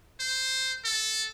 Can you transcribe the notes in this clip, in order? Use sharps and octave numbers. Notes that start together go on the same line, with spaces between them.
C5
A4